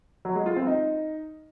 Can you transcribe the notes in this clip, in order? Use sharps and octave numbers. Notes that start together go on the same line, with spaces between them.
F#3
G#3
F4
C4
D#4